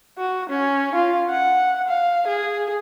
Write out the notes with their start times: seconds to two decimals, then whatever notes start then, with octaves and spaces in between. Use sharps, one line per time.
0.19 F#4
0.50 C#4
0.95 F4
1.30 F#5
1.88 F5
2.27 G#4